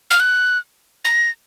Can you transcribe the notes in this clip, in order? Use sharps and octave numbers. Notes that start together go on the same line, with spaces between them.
F6
F#6
A#6